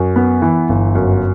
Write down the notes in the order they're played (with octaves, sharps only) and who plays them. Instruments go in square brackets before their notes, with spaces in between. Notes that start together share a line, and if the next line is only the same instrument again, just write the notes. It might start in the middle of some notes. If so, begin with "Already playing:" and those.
Already playing: [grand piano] F#2
B3
E3
G1
F#2